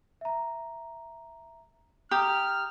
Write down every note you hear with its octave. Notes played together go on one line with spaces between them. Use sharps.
E5 A#5
G4 A#5 D#6 F6